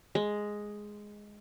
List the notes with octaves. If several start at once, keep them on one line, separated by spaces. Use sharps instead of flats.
G#3